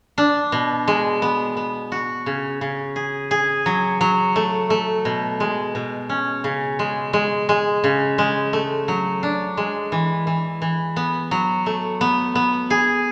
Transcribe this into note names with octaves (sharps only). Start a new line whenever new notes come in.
D4
B2
G#3
B3
B3
F#4
C#3
C#3
G#4
G#4
F#3
F#3
A3
A3
B2
G#3
B2
C#4
C#3
G#3
G#3
G#3
C#3
G#3
A3
F#3
D4
G#3
E3
E3
E3
B3
F#3
A3
B3
B3
G#4